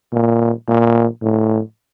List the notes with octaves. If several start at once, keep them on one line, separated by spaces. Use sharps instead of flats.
A#2
A#2
A2